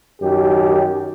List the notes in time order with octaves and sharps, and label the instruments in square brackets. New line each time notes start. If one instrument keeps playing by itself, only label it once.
[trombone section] F#2 D#3 G4